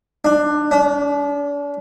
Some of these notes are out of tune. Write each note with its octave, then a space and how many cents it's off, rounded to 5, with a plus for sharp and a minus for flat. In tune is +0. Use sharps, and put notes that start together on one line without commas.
D4 +20
D4 -40